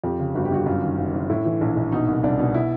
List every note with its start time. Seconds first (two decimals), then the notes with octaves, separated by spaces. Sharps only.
0.03 F2 G4
0.19 C#3
0.35 G1 F#4
0.45 G4
0.51 G1 F#4
0.66 F#2 F4
0.82 D#3
0.98 F#1
1.14 F#1
1.30 A2 E4
1.45 E3
1.61 A#1
1.77 A#1
1.92 B2 D#4
2.08 C2
2.23 C2 D4
2.39 B2
2.54 E4